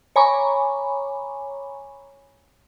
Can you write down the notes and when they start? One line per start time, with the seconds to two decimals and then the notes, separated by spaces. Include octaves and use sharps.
0.16 C#5 G#5 A#5 B5 C#6 D6